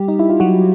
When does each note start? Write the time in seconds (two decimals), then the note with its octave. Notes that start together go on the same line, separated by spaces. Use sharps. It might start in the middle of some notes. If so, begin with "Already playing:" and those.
Already playing: G3 G4
0.08 D#4
0.19 E4
0.30 F4
0.40 F#3 F#4